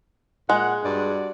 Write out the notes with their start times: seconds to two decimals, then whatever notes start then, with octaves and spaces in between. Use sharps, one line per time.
0.50 A#2 G#3 F#5
0.84 G2 F#4 D5